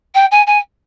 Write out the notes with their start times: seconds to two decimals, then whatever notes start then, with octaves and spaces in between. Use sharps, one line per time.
0.14 G5
0.31 G#5
0.47 G#5